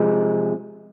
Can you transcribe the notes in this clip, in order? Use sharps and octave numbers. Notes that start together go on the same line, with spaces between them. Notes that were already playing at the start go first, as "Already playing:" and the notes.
Already playing: C3 F3 G#3